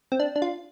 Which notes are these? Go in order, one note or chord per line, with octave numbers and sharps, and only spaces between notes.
C4
D4
D4
F4